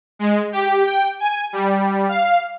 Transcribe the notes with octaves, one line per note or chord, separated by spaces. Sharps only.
G#3
G4
G5
G#5
G3
F5